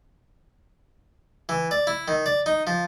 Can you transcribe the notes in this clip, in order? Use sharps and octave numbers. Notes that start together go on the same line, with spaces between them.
E3
D5
E4
D#3
D5
D#4
F3